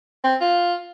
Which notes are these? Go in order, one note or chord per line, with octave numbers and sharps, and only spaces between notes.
C4
F4